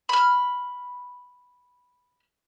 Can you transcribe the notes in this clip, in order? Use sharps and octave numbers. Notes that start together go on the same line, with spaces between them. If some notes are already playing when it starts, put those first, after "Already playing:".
B5 F6